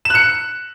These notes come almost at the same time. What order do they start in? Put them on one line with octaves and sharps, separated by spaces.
E7 F#6 C#7